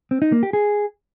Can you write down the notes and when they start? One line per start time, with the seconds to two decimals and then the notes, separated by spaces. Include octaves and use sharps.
0.11 C4
0.22 D#4
0.32 A#3
0.43 G4
0.53 G#4